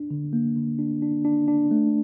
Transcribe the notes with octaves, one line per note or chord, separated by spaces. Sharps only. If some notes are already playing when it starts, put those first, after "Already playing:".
Already playing: D4
D3
A#3
D3
D4
D4
D4
D4
A3